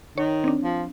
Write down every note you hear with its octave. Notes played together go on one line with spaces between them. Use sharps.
D#3 C#5
C4 D4
F3